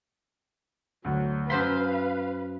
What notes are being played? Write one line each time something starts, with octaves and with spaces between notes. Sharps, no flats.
D2 F#3
F#2 B4 C5 F5 C6 B6